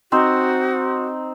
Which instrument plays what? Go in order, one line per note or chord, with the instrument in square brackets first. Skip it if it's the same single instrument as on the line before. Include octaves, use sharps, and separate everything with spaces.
[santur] C4 D#4 C5 [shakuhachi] F#4